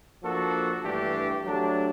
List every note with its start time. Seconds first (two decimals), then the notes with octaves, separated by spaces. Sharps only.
0.23 F3 A#3 D4 F#4 A4
0.84 G2 E3 A3 D4 G4
1.45 F#3 A3 D4 G4